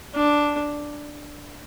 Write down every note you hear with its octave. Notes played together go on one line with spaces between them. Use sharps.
D4